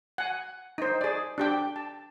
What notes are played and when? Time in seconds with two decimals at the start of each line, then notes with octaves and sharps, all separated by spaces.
0.18 F#5 G#5
0.78 D#4 C5
1.01 G#4 D5
1.38 D4 G4 G5
1.76 A5